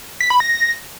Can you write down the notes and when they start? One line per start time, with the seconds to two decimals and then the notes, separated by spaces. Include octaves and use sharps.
0.20 B6
0.30 B5
0.40 A#6